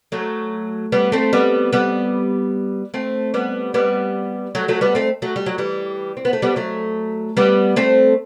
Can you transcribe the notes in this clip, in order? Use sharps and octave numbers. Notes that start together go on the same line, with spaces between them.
F#3 A3
G3 B3
A3 C4
G3 B3
G3 B3
A3 C4
G3 B3
G3 B3
F#3 A3
F#3 A3
G3 B3
A3 C4
F#3 A3
G3
F#3
E3 G3
C4
B3
A3
G3 B3
F#3 A3
G3 B3
A3 C4